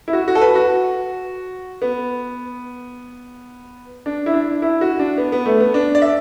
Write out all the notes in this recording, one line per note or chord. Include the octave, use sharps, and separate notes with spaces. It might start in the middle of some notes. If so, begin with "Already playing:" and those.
E4
F#4
F#4
A4
B4
F#4
B3
D4
E4
D4
E4
F#4
D4
B3
B3
A3
B3
D4
D5
E5